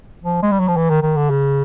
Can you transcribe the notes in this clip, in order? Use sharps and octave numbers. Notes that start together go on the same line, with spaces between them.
F3
G#3
G3
F#3
F3
E3
D#3
D#3
D3
C#3